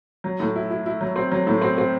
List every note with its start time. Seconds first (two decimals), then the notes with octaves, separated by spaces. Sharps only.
0.24 F#3
0.40 A2
0.56 E4
0.70 E4
0.86 E4
1.01 F#3
1.16 C4
1.32 F#3
1.47 A2
1.62 C4
1.78 C4